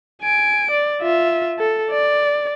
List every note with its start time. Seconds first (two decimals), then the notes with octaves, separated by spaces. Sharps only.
0.22 G#5 D7
0.71 D5
1.02 F4 E5
1.59 A4
1.90 D5